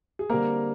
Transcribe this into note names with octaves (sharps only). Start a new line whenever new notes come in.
G#4
D3 G3 A#3 C4 A#4